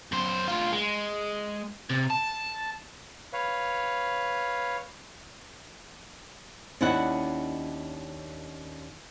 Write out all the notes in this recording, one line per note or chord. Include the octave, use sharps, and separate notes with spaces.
F#2 C5
D2 F4
G#3
C3
A5
B4 C#5 F5
D#2 C#4 D4 E4 E5 F#5